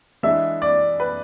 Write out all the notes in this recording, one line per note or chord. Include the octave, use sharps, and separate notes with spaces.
E3 G#3 D4 E5
D5
B4